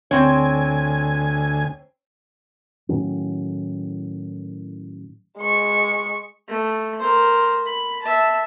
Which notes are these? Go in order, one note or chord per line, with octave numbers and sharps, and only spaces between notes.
D2 C4 C#5 G#5
A2 D#3 F#3 C#4
G#3 C#6
A3
A#4 C5
B5
E5 A5